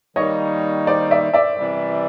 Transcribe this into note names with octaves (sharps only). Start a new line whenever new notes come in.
D#3 G3 A#3 D#4 C#5 D#5
C5 D5
D5 E5
D5 E5
C3 E3 G3